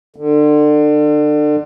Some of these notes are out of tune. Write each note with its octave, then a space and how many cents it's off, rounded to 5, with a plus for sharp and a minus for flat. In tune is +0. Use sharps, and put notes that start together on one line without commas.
D3 +30